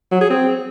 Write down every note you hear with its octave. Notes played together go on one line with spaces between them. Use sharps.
F#3
G#4
C4